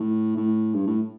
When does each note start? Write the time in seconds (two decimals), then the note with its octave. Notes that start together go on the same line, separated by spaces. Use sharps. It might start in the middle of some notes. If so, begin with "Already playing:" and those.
Already playing: A2
0.36 A2
0.74 G2
0.87 A2